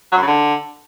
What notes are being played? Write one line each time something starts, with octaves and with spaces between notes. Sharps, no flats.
F#3
F#2
C#3
D3